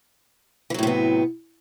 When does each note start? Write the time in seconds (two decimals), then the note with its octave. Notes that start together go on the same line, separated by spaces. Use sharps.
0.70 E3
0.74 F#3
0.79 A2
0.83 C3
0.87 B3